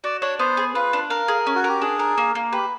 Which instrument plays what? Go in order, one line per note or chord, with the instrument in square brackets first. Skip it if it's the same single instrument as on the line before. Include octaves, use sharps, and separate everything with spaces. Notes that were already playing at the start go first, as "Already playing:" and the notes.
[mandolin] F#4 [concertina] D5
[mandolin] D4 [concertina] C#5
[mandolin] B3 [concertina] C5
[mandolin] G#4
[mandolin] F4 [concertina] B4
[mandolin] D4
[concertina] A#4 [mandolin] F5
[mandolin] G#4
C#4
[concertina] F#4
[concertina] G4 [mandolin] A#4
[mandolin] D4 [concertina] G#4
[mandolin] A#4
A#3
A#3
[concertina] G4 [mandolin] B4